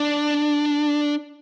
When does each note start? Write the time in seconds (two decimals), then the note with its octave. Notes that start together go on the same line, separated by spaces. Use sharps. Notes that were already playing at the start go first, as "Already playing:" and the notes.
Already playing: D4